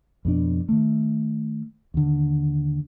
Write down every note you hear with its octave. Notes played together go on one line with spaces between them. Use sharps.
F2 B2 D4
D#3 A3
D#2 D3